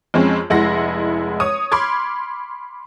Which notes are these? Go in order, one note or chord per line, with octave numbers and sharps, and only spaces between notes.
F2 G#3 C4 C#4
F1 G#3 E4 F#5 C6 A#6
C#5 D#6
B5 C6 D6 F6 G#6